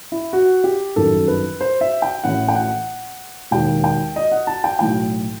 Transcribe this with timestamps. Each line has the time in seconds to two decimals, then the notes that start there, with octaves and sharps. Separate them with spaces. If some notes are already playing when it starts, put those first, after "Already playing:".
0.12 E4
0.33 F#4
0.64 G4
0.96 G1 F#2 D#3 A4
1.28 B4
1.61 C5
1.81 E5
2.02 G5
2.24 A1 A2 E3 F#5
2.48 G5
2.55 F#5
3.51 E1 D#2 D#3 G5
3.84 G5
4.16 D#5
4.32 F#5
4.47 A5
4.64 G5
4.79 B1 A2 E3 G5